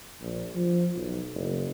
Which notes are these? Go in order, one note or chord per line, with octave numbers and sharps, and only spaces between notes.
A#1
F3
B1
F#1